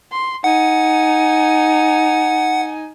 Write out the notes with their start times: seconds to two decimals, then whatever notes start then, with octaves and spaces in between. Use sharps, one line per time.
0.11 C6
0.44 D#4 F#5 G#5